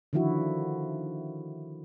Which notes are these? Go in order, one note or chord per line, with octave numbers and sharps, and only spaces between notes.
D3 D#3 F3 E4 F#4